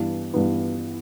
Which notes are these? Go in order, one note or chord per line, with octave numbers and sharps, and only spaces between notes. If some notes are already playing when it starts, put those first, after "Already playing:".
Already playing: G2 E3 B3
G2 E3 B3